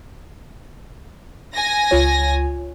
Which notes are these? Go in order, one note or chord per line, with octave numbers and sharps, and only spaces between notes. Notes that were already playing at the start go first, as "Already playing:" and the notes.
G#5 A#6
C#2 F4 C#5